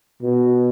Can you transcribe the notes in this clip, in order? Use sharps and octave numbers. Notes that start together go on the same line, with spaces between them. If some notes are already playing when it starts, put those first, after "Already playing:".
B2